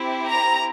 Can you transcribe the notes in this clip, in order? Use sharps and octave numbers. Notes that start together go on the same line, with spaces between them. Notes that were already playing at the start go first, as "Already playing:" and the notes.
Already playing: C4 E4 G4
A#5